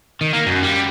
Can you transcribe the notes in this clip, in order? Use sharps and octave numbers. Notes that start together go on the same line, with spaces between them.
D#3
A#3
F#2
G3